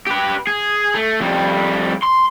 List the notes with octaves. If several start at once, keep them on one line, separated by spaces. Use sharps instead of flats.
G4 B4
G#4
A3
F2 G3
C6